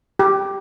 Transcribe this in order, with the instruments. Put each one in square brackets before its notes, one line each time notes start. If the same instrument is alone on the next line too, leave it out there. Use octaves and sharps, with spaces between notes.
[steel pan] G4